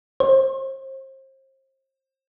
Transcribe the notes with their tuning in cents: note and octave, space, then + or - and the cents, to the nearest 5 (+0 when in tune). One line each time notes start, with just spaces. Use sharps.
C5 +35